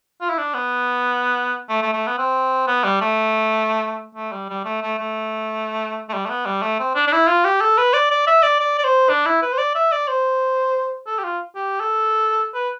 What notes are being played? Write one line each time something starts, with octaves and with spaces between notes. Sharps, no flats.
F4
E4
D4
B3
A3
A3
A3
B3
C4
B3
G3
A3
A3
G3
G3
A3
A3
A3
A3
G3
A3
B3
G3
A3
C4
D4
D4
E4
F4
G4
A4
B4
D5
D5
E5
D5
D5
D5
C5
D4
E4
B4
C5
D5
E5
D5
C5
A4
G4
F4
G4
A4
B4